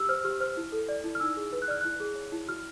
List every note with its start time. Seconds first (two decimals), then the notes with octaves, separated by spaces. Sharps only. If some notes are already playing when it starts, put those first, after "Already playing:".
Already playing: G4 E6
0.09 C5 F6
0.24 G4 F6
0.40 C5 F6
0.57 E4
0.72 A4
0.89 D5
1.04 E4
1.15 F6
1.20 D#4 E6
1.37 G#4
1.52 B4
1.62 F#6
1.68 D5 F6
1.81 E4 F#6
2.00 G#4
2.15 C#5
2.32 E4
2.48 F#4 F6